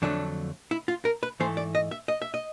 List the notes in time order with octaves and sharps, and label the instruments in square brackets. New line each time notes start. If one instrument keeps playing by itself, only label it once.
[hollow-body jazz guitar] F2 D3 F#3 A3 D4
E4
F4
A#4
B4
G#2 E3 A3 C5
D5
D#5
E5
D#5
E5
D#5